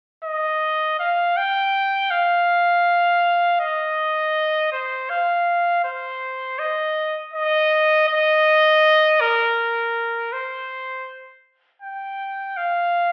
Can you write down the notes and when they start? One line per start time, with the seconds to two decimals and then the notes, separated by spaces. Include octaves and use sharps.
0.25 D#5
0.99 F5
1.37 G5
2.11 F5
3.60 D#5
4.72 C5
5.10 F5
5.85 C5
6.59 D#5
7.34 D#5
8.08 D#5
9.21 A#4
10.33 C5
11.82 G5
12.57 F5